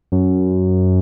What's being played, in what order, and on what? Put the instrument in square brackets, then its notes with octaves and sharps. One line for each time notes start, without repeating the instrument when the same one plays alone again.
[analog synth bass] F#2